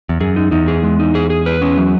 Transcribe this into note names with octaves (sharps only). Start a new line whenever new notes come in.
E2
F#2 G#4
D#4
E2 D#4
G#4
G#3
D#4
G#4
G#4
B4
C#4
F#3